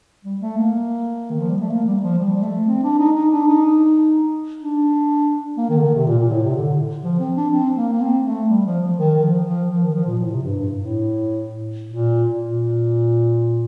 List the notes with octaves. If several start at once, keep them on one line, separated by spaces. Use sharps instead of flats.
G3
A3
A#3
D#3
F3
G3
A3
A#3
G3
F3
G3
G3
A3
C4
D4
D#4
D#4
D4
D#4
D4
A#3
D#3
D3
D#3
C3
A#2
A#2
A2
C3
D3
F3
C4
D4
C4
A#3
A#3
C4
A3
G3
F3
F3
D#3
D#3
F3
F3
F3
D#3
F3
A#2
A2
C3
G2
G2
A2
A#2
A#2